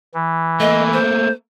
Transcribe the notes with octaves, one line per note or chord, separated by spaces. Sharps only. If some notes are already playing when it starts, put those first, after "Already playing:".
E3
A3 A#3 D#5
C5